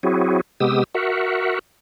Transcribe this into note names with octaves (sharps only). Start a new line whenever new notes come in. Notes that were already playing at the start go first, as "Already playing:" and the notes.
F#3 C4 E4 F#4 G#4
C3 G#3 B3 G4 D#6 E6
F#4 A#4 E5 F#5